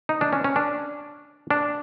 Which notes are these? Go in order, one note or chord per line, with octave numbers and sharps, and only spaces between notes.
D#4
D4
C#4
C#4
D4
D4